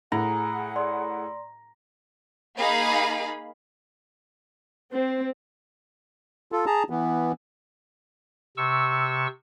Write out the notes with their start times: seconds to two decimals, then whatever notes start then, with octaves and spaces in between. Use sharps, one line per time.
0.12 A2 G#4 F#5 A#5
0.76 D5 C6
2.58 A#3 D#4 G#4 F5 B5
4.93 C4
6.52 F4 A4
6.66 G#4 A5 A#5
6.90 E3 B3
8.57 C3 C#6 E6